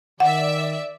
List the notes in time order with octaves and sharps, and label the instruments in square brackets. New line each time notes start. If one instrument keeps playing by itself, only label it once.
[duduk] D#3 [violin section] D5 E5 [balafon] F#5